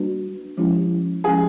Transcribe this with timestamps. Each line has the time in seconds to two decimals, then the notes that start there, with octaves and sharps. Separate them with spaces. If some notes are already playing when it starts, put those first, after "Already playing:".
Already playing: G3 A#3 D4 F#4 B4
0.57 F3 G#3 C#4 E4 G4
1.24 F3 G#3 C#4 E4 G4 G#4